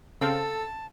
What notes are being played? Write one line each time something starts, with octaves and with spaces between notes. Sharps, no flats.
C#3 C4 A4 F5 A5